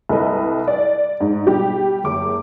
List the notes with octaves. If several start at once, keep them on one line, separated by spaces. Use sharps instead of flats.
C2 A4 B4 D#5
D5
G#2
B2 G3 G4
F#1 D6